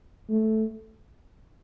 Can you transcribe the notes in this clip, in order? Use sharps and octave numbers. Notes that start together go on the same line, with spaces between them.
A3